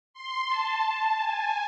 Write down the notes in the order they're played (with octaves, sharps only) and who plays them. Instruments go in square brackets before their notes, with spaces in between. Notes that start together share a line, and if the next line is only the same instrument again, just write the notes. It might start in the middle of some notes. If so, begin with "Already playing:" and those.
[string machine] C6
A5
G#5